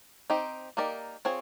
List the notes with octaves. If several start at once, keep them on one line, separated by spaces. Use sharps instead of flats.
C4 D#4 G4
A#3 D#4 G4 A#4 D5
C4 F4 G#4 C#5